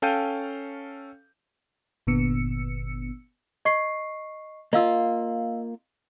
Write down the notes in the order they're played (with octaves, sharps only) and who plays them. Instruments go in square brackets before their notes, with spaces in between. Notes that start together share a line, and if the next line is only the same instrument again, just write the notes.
[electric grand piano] C#4 A4 F5 G5 G6 D#7
[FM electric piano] G1 A#2 D3 B3 E6 C#7
[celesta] D#5 C#6 C7
[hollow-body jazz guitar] A#3 F4 [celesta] D#5 F5 E6